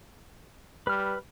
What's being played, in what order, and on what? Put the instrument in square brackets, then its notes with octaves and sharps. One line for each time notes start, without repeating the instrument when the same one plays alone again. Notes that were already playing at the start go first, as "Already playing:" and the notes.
[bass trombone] G3 [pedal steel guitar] B4 F6